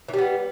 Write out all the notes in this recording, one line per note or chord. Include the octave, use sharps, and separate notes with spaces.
E3 G3 B3